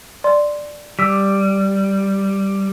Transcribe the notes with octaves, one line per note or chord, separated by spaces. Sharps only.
D5 C6
G3 D6 E6 B6